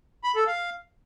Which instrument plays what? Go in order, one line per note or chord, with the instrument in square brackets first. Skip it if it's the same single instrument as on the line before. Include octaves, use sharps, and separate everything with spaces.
[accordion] B5
A4
F5